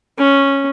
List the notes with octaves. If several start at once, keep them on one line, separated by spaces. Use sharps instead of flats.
C#4